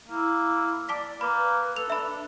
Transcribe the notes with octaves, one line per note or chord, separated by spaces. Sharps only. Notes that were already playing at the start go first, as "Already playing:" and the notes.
A#3 E4
D5 A5 D6 B6
A#3 B4 B5 D6
A4 F7
D4 E5 B5